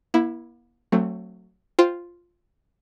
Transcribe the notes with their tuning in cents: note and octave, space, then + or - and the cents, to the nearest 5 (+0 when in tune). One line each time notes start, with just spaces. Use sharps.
A#3 +45 E4 +0
F#3 +0 A3 +30 C4 +25
F4 +0 C5 +0 G5 +0